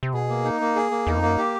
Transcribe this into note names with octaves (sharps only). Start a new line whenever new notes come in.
C3
B2 G#4
A#3
D#4
A#3
G#4
A#3
E2 D#4
F2
F#2 A#3
G4